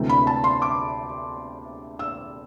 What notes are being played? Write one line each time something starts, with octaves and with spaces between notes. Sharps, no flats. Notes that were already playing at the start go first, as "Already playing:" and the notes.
Already playing: D2 C3 E3 A3
B5
A5
C6
D6
E6